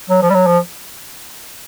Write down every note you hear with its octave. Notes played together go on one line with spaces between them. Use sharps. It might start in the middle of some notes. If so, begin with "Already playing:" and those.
F#3
F3
G3
F#3
F3